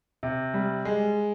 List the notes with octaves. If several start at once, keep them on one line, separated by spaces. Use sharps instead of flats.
C3
G3
G#3